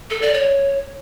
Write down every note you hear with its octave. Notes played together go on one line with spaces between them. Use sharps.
A4
D5
C#5